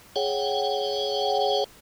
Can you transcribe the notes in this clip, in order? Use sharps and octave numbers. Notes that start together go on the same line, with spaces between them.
G#4 C#5 F#5 G5